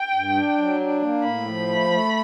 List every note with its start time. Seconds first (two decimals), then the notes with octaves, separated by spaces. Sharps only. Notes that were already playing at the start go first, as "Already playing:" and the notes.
Already playing: G5
0.15 G2
0.36 D4
0.58 F#3
0.80 D4
1.02 A#3
1.24 A2 B5
1.46 F3
1.68 A3
1.90 A3